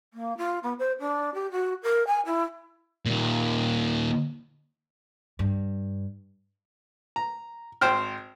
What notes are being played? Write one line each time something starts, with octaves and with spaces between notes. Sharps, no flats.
A#3
F4
B3
C5
D4
G4
F#4
A#4
G#5
E4
D#2 A#2
G2
A#5
G#1 C5 G5 F6